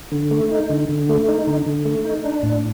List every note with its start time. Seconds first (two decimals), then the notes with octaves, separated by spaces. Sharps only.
0.12 D3
0.31 A3
0.51 D#4
0.69 D3
0.89 D3
1.09 A3
1.28 D#4
1.47 D3
1.66 D3
1.85 A3
2.05 D#4
2.24 D4
2.43 A2